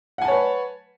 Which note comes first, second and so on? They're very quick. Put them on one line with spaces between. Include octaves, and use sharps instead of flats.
F#5 G#5 A5 C#5 B4